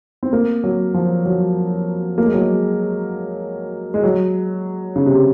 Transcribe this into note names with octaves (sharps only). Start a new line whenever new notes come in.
C4
A#3
F#3
F3
F#3
A#3
G#3
F#3
G#3
G#3
F#3
C#3
C3